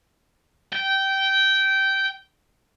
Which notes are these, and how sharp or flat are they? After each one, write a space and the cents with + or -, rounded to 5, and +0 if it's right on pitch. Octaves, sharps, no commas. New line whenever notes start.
G5 -15